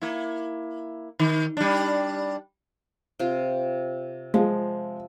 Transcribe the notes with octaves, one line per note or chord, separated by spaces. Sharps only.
A#3 E4
D#3
G3 D4
C3 F4
F3 G#3